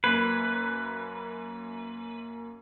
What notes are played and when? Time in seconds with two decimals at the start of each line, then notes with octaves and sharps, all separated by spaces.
0.04 F#2 A#3 B4 G#6